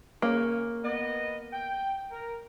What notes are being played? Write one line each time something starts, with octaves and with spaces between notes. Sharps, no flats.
C#3 A#3 C#4
B3 D#5
G5
A#4